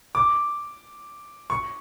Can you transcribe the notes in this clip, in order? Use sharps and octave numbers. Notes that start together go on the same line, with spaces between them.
D6
C#6